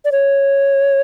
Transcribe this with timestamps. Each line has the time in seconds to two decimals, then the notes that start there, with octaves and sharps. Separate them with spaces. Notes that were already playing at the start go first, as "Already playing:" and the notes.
0.05 D5
0.12 C#5